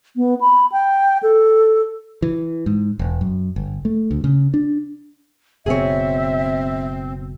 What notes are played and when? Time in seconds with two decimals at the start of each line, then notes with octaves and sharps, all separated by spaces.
0.16 B3
0.40 B5
0.72 G5
1.23 A4
2.22 E3
2.66 G#2
2.99 E1
3.21 F#2
3.56 G1
3.85 A3
4.11 D2
4.24 C#3
4.54 D4
5.66 F#1 B2 C4 G#4 C#5 E5